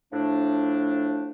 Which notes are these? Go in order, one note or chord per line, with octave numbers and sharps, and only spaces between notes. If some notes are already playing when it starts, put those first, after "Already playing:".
A2 F3 A3 D4